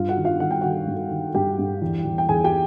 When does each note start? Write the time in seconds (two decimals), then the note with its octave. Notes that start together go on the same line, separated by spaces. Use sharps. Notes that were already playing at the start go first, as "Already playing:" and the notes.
Already playing: G2 F4 F5
0.09 F#4 F#5
0.17 D#3
0.25 F4 F5
0.40 D#3 F#5
0.51 G5
0.61 D#3 F#4 F#5
0.87 G2
1.11 D#3
1.34 G2 G4 G5
1.58 G2
1.82 E2
2.05 E2
2.18 G5
2.29 E2 G#4 G#5
2.44 G4 G5